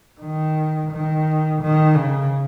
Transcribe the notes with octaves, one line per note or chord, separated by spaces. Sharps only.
D#3
D#3
D#3
C#3